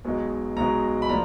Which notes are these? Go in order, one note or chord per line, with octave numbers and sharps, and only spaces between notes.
B1 B2 G#3 D#4
B1 B2 G#3 D#4 A#5
B5
F3 A#3 D4 A#5